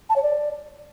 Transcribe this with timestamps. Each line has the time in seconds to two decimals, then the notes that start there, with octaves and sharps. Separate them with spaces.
0.09 A5
0.15 C#5
0.22 D5